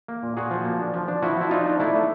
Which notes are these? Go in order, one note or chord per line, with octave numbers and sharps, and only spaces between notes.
A#3
A#2
A#2 F#4 G#4
F3
A#3
D4
F3
D4
F3 E4 F#4
F3 E4
D4 D#4 F4
D4
A3 D4 E4
A3